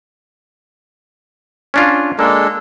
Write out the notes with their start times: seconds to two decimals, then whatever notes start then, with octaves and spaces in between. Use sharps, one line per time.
1.74 C#4 D4 F4
2.19 G#3 A#3 D4 A4